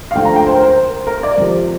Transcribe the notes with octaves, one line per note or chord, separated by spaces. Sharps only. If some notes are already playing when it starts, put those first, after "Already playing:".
F5
D2 D3 F3 G5
A#5
G5
C5
A#4
C5
A#4
D5
F2 C3 F3